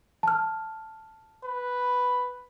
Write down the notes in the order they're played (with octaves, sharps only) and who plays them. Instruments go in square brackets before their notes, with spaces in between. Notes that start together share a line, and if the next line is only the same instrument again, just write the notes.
[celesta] A5 F6
[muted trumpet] B4